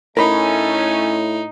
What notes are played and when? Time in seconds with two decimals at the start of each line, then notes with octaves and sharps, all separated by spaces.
0.17 A2 A3 C#4 D#4 A#4 B5